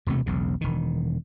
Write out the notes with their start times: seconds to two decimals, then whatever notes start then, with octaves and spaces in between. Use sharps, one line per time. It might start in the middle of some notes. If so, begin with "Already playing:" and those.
0.07 E1 D2 C3 A3
0.26 E1 B1 C#3
0.61 E1 D#3